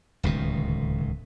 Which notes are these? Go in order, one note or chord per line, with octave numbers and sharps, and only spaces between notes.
D1 C#2 B2 D#3